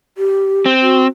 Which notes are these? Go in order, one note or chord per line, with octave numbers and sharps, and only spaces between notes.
G4
C4
F#4